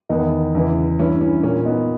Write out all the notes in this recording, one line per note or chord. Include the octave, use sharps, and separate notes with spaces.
E2 D#3 B3 D#4
E2 C#3 E3
G2 E3 C#4 E4
C#4 E4
A#2 C#4
B3 D#4